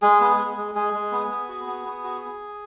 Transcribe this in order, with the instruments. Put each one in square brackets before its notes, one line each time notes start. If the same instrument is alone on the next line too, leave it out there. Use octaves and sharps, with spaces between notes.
[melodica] G#3 G#4
B3
G#3
G#3
G#3 G#4
G#3
B3
B3
F#4
B3
B3
F#4